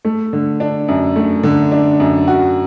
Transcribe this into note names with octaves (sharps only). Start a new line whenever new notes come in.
A3
D3
D4
F#2
A3
D3
D4
F#2
F#4